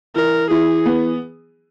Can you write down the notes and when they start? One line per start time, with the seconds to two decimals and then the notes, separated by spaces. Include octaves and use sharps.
0.15 E3 A#4
0.50 E3 G#4
0.86 B3